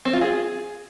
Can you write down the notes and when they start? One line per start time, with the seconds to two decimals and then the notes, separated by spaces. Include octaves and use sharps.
0.05 C4
0.13 F4
0.21 G#4